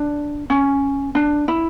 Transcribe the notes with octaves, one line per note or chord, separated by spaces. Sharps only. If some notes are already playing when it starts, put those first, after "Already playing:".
Already playing: D4
C#4
D4
E4